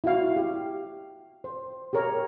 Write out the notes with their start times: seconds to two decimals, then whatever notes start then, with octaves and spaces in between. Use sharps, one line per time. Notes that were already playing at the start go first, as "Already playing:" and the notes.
0.04 E4 F#4 F5
0.36 G4
1.44 C5
1.93 G4 G#4 A#4 C#5